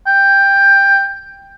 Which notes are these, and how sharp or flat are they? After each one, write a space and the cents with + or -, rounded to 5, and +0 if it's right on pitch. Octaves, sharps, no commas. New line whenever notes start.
G5 +10